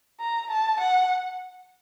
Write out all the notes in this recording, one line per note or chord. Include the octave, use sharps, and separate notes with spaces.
A#5
A5
F#5